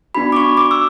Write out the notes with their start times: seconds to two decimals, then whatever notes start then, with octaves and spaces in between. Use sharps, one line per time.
0.15 B3 D4 F#4 B5
0.32 D6
0.36 C#6
0.57 D6
0.71 E6